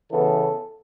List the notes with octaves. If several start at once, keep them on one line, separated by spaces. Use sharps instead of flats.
C#3 E3 B3 A4